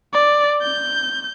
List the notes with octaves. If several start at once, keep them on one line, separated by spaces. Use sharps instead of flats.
D5
G6